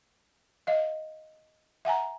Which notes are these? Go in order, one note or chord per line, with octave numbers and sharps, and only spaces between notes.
D#5 F5
E5 F#5 G#5 A#5